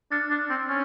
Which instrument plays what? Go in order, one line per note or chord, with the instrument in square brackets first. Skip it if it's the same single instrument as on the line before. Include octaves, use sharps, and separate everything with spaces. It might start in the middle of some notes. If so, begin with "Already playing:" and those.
[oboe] D4 [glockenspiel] F6 A6 C#7
[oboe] D4
C4
[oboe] C#4 [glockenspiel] F6 A6